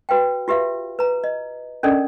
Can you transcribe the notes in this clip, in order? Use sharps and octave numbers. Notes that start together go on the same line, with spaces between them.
F#4 B4 F5 G5
F4 G4 B4 E5 F5
B4 A#5
D#5
C#4 D4 A4 A#4 D5 D#5